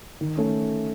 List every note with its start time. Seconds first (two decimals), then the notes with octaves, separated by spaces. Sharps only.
0.21 D#3
0.37 A3 C#4